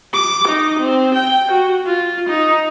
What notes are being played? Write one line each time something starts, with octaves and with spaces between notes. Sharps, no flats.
D6
D#4
C4
G5
F#4
F4
D#4